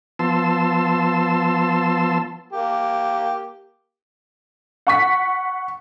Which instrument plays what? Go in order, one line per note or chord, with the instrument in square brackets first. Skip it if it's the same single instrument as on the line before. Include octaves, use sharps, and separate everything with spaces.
[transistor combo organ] F3 B3 A5 C6 E6
[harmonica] A#3 G4
[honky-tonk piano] F#5 C#6 B6